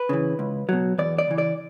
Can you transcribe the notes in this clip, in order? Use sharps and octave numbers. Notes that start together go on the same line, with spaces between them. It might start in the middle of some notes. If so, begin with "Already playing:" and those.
Already playing: B4
C#3 E3
C#2
B2 F#3
E2 D5
D5
C#3 E3
D5